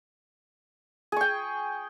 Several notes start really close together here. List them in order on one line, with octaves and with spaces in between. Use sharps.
G#4 C#6 G5